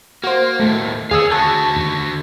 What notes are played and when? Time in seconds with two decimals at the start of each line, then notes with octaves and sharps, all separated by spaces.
0.24 A#3 F#4 C5
0.60 D#2 A2 A3
1.11 D#2 G#4 C#5 F5 D#6 E6
1.31 D3 F#4 A5 C#6 F#6 G#6
1.76 D#2